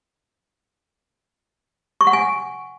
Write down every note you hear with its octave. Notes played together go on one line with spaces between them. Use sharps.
C#6
F#5
G#5